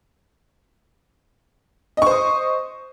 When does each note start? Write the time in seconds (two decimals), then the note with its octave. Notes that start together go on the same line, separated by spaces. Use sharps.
1.97 D#5
2.02 C#6
2.06 C5
2.11 D#6